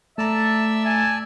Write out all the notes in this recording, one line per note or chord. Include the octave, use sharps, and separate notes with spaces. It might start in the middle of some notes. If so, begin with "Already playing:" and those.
A3 D5 E5 A5 A#5 E6
G#5